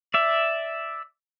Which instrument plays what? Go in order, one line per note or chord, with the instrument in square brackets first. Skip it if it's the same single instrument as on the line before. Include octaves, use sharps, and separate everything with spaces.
[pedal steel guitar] D5 E5